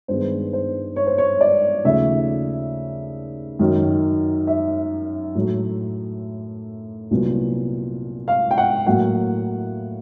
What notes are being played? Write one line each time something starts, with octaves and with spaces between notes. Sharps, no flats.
G2 D#3 G#3 B3 C5
C5
C#5
C5
C#5
D5
D#2 C#3 F3 A3 E5
F#2 D#3 F#3
E5
A2 F#3 A3
C2 A#2 F#3 B3
F5
G5
F#5
A2 F#3 A#3 F#5